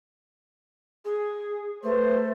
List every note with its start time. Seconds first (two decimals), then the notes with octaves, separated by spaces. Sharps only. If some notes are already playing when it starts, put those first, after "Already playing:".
1.05 G#4
1.83 A3 B4 C5